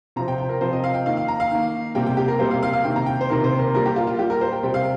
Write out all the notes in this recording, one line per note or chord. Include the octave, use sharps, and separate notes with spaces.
C3 F3 C4 A#5
G5
G5
A#4
C3 F3 C4 C5
D#5
F5
G5
D#3 A#3 F5
F5
A#5
F5
D#3 A#3
C3 G3 A#3 G5
G5
G4
A#4
C3 G3 A#3 C5
F5
F5
F5
C3 D#3 A#3 G5
A#5
G5
C5
C3 D#3 A#3 A#4
C5
A#4
A#2 G3 A#3 A#4
G4
F4
F4
A#2 G3 A#3 G4
A#4
C5
G5
C3 G3 C4 G5
F5